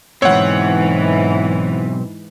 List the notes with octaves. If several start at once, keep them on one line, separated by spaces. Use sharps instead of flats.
B1 G#2 E3 C4 C#5 F#5